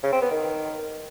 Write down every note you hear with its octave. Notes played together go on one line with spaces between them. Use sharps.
C#3
C4
B3
D#3